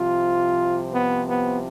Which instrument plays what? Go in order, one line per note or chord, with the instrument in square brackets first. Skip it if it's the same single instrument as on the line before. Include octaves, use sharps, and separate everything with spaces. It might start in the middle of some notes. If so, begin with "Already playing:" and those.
Already playing: [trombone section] C2 C3 F3 F4
B3
B3